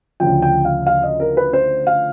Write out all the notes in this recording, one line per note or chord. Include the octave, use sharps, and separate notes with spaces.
D2 C#3 F3 G5
G5
F5
F5
D#5
A#4
B4
C5
F5